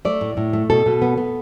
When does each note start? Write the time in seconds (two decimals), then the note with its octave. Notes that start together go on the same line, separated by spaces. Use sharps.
0.05 A3 D5
0.21 A2
0.37 A2
0.53 A3
0.70 B2 A4
0.86 B2
1.02 B3
1.17 B3